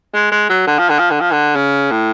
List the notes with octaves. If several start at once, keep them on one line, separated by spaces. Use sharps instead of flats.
G#3
G#3
F#3
D3
F3
D3
F3
D3
F3
D3
C#3
A2